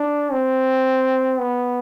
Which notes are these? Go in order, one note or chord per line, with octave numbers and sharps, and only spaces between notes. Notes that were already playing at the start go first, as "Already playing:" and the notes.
Already playing: D4
C4
B3